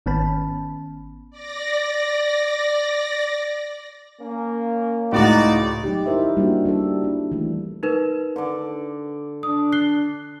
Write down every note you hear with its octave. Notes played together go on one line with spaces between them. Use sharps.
G#1 D#3 B3 C#4 A5 B5
D5 A#6
A#3 C#4
C#2 A2 D#4 F#4 D5
F#3 C#4 D#4 G4
D#4 E4 A#4 C5 E5
G3 A#3 D4 F#4
G3 D4 A4
D4 E4
E3 A3
D#4 A#4 B4
D3 D5
D4 D#6
F#6 C7 G7